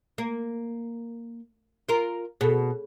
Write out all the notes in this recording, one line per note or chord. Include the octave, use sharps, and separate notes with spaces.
A#3
F4 A#4
B2 G#4 A4